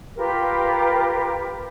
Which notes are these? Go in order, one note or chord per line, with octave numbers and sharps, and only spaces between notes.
F4 G4 A#4 B4